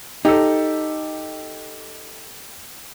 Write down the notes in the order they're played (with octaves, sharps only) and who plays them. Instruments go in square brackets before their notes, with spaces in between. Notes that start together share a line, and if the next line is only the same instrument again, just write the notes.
[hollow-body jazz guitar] D#4 [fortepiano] G4 A4